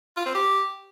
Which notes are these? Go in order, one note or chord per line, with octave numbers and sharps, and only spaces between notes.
F4
C4
G4